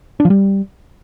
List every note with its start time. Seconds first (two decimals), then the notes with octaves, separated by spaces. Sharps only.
0.20 D4
0.25 F3
0.30 G3